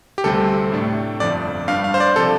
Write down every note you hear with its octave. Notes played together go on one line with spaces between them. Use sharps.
G4
D2 C3 G3 C4 A4
A2 A3 D4
G1 F2 F3 D4 D5
G2 G3 D4 F5
F5
C5
D5
C3 F3 A4